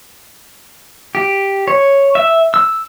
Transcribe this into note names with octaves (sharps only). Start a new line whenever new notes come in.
G4
C#5
E5
E6